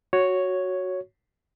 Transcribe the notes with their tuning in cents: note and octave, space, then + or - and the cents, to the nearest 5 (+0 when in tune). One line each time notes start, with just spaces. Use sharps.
F#4 +0 C#5 +0